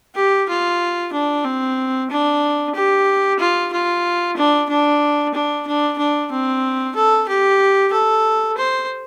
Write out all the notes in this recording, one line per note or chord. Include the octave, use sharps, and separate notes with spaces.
G4
F4
D4
C4
D4
G4
F4
F4
D4
D4
D4
D4
D4
C4
A4
G4
A4
C5